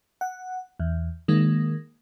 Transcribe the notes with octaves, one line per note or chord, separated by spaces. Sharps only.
F#5
E2
D#3 G#3 A#3